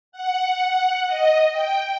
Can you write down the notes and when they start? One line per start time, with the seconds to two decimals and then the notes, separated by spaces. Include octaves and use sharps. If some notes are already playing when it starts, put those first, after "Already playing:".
0.12 F#5
1.07 D#5
1.51 G5